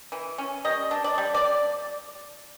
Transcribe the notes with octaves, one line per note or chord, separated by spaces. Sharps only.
E3
C#4
G3 D#5
D4
D5
G3
D5